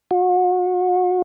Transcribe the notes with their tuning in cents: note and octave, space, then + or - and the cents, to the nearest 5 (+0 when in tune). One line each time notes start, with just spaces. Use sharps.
F#4 -35